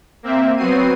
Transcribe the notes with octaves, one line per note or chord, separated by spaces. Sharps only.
A#3 C4 E5
F#3 B3 C4 F#4 C7 D#7